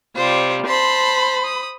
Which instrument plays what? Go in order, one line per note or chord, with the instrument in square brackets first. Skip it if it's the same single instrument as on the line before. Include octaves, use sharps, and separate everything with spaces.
[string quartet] C3 G3 [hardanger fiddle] F4 C5
[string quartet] C5 B5 [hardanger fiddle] A5 C6
[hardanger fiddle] D#6